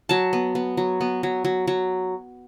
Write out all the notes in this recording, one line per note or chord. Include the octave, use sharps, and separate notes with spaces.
F#3 A5
B3
B3
F#3
B3
F#3
F#3
F#3